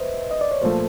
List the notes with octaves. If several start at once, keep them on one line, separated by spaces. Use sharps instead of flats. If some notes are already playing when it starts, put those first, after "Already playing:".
Already playing: B4 C5 D#5 E5
D#5
D5
C#5
A#2 F3 A3 C5